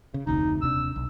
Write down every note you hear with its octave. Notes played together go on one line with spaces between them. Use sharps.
C#3
F1 D2 C3 D#4
D#1 C3 D4 E6
B1